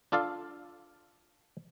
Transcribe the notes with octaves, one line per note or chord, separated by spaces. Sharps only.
D4 F4 A4 D5 F5